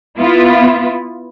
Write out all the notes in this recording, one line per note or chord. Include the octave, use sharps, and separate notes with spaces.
B3 E4 F4